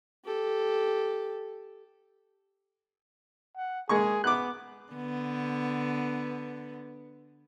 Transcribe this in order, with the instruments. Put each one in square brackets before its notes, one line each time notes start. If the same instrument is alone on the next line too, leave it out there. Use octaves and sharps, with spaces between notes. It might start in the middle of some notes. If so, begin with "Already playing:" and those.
[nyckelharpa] G4 A4
[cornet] F#5
[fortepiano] G#3 A#3 C#6 [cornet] G#4
[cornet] B3 [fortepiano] D6 F#6
[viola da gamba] D3 B3